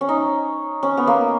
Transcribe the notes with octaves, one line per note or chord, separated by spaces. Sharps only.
C#4
D#4
C#4
B3
A#3